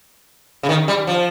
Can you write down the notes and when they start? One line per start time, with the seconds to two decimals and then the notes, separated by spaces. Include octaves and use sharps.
0.63 C#3
0.69 D#3
0.88 G3
1.07 F3